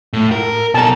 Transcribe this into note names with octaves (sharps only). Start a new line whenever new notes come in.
A2
A#4
B2 A4 A5 A#5